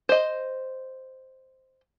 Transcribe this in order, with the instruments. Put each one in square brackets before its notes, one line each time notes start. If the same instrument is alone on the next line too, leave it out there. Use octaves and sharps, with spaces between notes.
[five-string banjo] C5 D#5